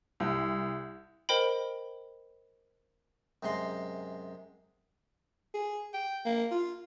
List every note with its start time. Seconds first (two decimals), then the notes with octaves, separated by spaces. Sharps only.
0.20 C2
1.29 A#4 C5 D#5 G5 B5
3.43 F#2 C3 G#3 A#5 C6
5.54 G#4
5.94 G5
6.25 A#3
6.51 F4